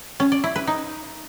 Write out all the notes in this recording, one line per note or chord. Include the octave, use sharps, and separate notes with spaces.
C#4
D5
E4
B4
D#4